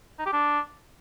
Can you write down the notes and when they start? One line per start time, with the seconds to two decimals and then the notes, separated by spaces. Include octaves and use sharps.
0.19 D#4
0.26 G4
0.33 D4